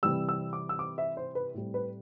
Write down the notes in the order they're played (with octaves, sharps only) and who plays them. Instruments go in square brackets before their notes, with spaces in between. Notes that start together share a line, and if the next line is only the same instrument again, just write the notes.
[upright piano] C3 E3 G3 E6
E6
D6
E6
D6
E5
C5
B4
A2 G3 C4
B4